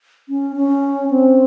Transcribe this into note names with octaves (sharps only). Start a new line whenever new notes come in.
C#4
C#4
C4